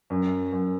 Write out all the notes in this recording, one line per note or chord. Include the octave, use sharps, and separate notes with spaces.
F#2
F#2